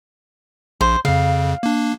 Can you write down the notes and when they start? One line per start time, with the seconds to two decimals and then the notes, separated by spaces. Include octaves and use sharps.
0.81 A#1 C5
1.05 F2 C#3 F5
1.63 A#3 D4